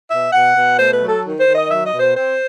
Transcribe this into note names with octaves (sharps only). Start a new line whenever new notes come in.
B2 E5
B2 F#5
B2
A3 C5
B4
F#3
A4
D#3
C5
D#3
D#5
F#3 E5
D#5
B2
C5
C4 C5